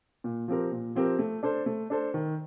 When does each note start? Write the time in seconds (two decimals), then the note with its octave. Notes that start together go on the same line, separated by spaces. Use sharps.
0.24 A#2
0.48 F3 C4 G4 A#4
0.72 A#2
0.95 F3 C4 G4 A#4
1.19 A3
1.43 D4 A4 C5
1.66 A3
1.90 D4 A4 C5
2.14 D#3